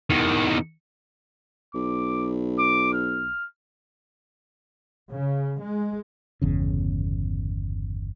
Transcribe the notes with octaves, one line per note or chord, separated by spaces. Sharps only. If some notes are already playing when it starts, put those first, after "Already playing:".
E2 D#3
B1 D6
D6
F6
C#3
G#3
G1 E2 C#3